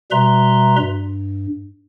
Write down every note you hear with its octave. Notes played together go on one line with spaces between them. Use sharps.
B2 G3 B4 E5 A#5 C6
G2